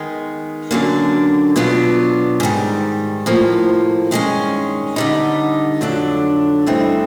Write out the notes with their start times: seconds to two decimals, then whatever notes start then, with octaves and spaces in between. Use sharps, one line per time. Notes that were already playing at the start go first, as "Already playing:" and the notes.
Already playing: D#3 G#3 B3
0.71 F#2 D3 F#3 A#3 D4
1.56 B2 F#3 B3 D4 F4
2.40 G#2 D#3 G3
3.26 A2 F3 A#3
4.11 G2 D#3 G#3 C#4
4.96 D3 G3 B3 D#4
5.81 F2 D3 F#3 A3 D4
6.66 G2 E3 A3 C4 D#4